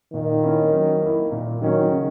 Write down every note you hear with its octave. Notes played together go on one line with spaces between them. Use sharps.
A#2 D#3
A#3 C#4 E4
F#3
A#3 E4
A#2
D#3 F#3 C#4 F#4
C#3